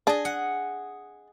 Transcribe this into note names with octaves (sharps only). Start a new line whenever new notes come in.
D4 G#4 D#5 A5
F#5